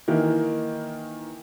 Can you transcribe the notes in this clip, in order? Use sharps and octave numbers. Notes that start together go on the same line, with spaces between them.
D#3 E3 A#3